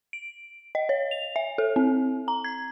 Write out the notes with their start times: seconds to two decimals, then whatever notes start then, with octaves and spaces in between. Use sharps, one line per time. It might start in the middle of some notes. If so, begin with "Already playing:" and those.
0.13 D7
0.75 D#5
0.89 C#5
1.11 F7
1.36 E5
1.58 A4
1.76 C4
2.28 A#5
2.44 G#6